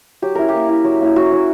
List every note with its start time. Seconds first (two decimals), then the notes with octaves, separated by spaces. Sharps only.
0.22 F#3 G4
0.35 C#4 E4 A#4
0.49 G4
0.54 A#3
0.69 E4
0.84 F#3
1.01 A#3 C#4 E4
1.16 F#3 F#4
1.32 C#4 E4